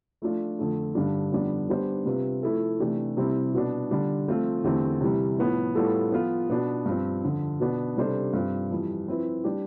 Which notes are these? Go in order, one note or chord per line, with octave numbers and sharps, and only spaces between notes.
F3 A3 D4 F4
F2 D3 A3
G2 D3 G3 D4
F2 D3 G3 B3 D4
G3 B3 D4 G4 C5
C3 G3 C4 F4 B4
F3 A3 E4 A4
C3 E3 A3 D4 G4
C3 G3 C4 E4
B2 B3 D4
D3 G3 D4
F3 A3 C4 F4
E2 D3 A3 C4 G4
C3 E3 G3
A2 F3 B3
A2 G3 B3 F4 A4
F3 B3 F4
B2 B3 D4
G2 F3 C4
F2 D3 F3
B2 B3 D4
C3 G3 D4 A4 C5
G2 F3 C4 G4
F2 E3 G3
F3 C4 E4 B4
G3 D4 G4